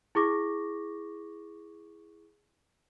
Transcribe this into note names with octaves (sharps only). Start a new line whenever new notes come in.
E4 G#4 C#6 D6 A#6